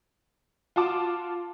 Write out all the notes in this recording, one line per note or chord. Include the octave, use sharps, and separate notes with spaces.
F4 F#4 A5 D6